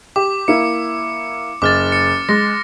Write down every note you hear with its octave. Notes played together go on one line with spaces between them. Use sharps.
G4 D6
A#3 E4 C#7
F#1 D6 F6 A6
C#7
G#3 A#6